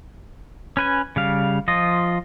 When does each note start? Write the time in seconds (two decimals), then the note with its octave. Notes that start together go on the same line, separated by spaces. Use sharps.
0.77 C#4 B4 G#5
1.16 C#3 G3 F5
1.68 F3 F4 D#5